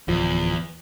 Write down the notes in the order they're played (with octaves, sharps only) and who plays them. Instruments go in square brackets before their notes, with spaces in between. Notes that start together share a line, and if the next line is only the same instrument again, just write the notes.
[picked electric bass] D1 F3 [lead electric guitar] E2